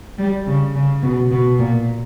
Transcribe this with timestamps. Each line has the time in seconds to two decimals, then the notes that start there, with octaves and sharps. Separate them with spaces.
0.18 G3
0.47 C#3
0.75 C#3
1.03 B2
1.31 B2
1.59 A#2